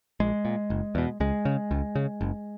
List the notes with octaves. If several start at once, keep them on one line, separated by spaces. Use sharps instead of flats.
A#1 G#3
A#2
F#1
E2 B2
C#2 G#3
C#3
C#2
C#3
F#1